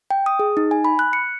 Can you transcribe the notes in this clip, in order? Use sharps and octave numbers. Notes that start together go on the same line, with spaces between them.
G5
D#6
G#4
D#4
G#5
B5
F#6
C#7